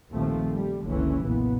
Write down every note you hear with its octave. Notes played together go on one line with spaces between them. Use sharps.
A#1 D#2 F3 A3 C4
G3
F#1 C#2 D3 E3 C#4
F#1 B1 A#2 B3